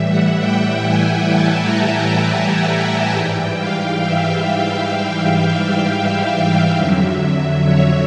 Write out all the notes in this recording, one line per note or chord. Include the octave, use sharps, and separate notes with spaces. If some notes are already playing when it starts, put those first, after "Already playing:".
Already playing: A2 E3 G3 E5
F#5
G5
G#5
A5
A#5
G#5
G#5
G#2 E3 G3 G5
F5
E5
E5
F5
F5
E5
F2 D3 F#3
C#5